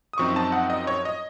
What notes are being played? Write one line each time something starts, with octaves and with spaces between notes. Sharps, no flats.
D#6
F#2 F3 C4 D#4 C#6
A5
F#5
D#5
C#5
D#5